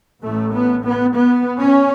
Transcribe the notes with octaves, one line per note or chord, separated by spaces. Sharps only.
A1 A2 A3
B3
B3
B3
C#4